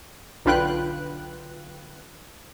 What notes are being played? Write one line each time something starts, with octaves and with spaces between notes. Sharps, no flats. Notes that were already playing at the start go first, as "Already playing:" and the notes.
B1 D3 F4 B4 G5 F#6